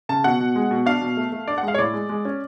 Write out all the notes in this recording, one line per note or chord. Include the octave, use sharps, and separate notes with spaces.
C#3 A5
B2 F#5
B2
G#3
B2
D4 F5
B2
A3
A3
D4 D5
F#5
G#3
F5
C#5
A2 D5
G#3
G#3
C#4